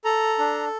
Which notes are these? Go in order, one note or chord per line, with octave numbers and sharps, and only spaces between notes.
A4 A#5
D4